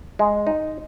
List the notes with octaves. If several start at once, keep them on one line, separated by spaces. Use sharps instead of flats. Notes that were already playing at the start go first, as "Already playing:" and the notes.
G#3
D#4